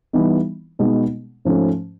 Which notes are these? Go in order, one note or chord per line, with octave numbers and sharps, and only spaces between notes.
E3 G3 B3 D#4
B2 G#3 B3 D#4
G#2 F3 A3 C#4